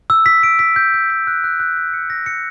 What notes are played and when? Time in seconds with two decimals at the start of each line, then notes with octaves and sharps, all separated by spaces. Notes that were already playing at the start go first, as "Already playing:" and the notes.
0.10 E6
0.26 B6
0.43 D7
0.59 B6
0.76 G6
0.94 G6
1.10 B6
1.27 F#6
1.44 F#6
1.60 F#6
1.77 B6
1.93 C#7
2.10 A#6
2.26 C#7